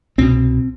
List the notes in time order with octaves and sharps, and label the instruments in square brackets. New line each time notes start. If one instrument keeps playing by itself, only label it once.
[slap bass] C2 B2 C4